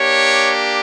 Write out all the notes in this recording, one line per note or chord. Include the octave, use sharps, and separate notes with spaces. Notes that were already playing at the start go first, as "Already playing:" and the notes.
Already playing: A#3 D4 G4 C#5